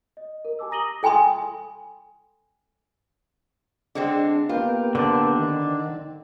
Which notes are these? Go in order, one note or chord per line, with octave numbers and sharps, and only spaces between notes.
D#5
A#4
G4 G#5 A5 D6 E6
A#5 D#6 A#6 D#7 F#7 G7
A4 G5 G#5 B5 C6 D#6
D3 G#3 C4 D4
A#3 B3 F4 G4
D3 C4 D4
D#3